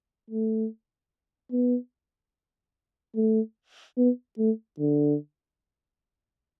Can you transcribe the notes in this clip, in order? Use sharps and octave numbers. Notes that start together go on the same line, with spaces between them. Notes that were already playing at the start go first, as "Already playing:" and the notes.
A3
B3
A3
B3
A3
D3